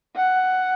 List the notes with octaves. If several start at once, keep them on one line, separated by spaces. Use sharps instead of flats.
F#5